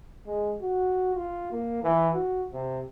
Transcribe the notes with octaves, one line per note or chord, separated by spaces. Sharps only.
G#3
F#4
F4
A#3
E3
F#4
C3